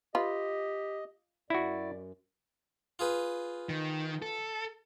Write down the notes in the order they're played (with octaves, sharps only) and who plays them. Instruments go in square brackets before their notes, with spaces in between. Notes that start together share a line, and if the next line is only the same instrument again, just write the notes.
[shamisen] F4 B4 [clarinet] G4 [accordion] D#5
[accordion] F#2 [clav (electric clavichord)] E4 F#4 [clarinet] D5
[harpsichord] F4 G#4 B4
[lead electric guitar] D#3
A4